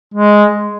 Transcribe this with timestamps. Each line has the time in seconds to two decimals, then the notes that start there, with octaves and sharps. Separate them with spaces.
0.14 G#3